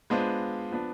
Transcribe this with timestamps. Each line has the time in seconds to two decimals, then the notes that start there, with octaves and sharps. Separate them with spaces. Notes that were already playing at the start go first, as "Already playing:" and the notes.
0.10 G#3 B3 D4 F4 C5
0.71 F3 B3 D4